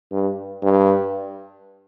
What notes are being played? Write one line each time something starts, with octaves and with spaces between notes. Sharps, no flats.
G2
G2